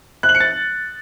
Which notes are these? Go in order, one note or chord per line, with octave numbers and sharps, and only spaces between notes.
F#6
F#7
C#7
A6